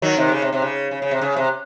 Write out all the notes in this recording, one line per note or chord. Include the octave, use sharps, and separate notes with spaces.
D#3 F#3
C3 D#3
C#3
C3
C3
C#3
C#3
C#3
C3
C#3
C3